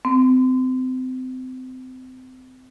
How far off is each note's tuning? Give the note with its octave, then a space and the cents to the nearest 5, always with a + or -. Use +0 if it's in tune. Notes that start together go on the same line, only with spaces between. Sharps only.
C4 -30